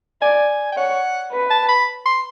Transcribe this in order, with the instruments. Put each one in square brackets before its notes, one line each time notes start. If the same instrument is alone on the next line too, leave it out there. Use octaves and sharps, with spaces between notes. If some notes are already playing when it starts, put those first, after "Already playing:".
[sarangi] D5 [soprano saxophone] G#5
[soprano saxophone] G5
[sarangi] C#5 [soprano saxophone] F#5
[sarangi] B4
[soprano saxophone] A5
B5
C6